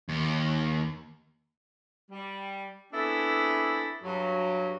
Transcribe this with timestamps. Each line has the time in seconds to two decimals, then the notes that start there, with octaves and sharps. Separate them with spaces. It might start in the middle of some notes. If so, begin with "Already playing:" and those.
0.09 D#2
2.11 G3
2.92 B3 C4 D4 E4 G#4 A4
4.04 G2 F#3